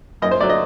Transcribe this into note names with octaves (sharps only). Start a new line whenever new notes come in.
F#2 D#5
C5
F#3 A3 D5
D#5